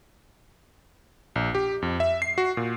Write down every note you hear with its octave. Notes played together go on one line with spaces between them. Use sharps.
A#1
G4
F2
E5
C7
F#4
A#2